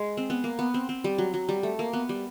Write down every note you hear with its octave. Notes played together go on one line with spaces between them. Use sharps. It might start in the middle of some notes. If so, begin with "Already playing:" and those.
Already playing: G#3
C4
B3
A#3
B3
C4
C4
G3
F#3
F#3
G3
A3
A#3
B3
G3